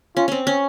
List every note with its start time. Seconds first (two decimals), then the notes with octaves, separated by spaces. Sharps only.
0.17 C#4 F4
0.28 C4 C#4
0.47 C#4